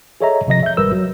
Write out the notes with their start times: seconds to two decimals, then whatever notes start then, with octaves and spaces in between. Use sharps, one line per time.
0.21 G#4 A4 C#5 D#5 E5 A#5
0.47 A1 C3 F3 D#5 A#6
0.63 E5 G6
0.77 G#1 G3 A#4 B4 E6
0.92 F#3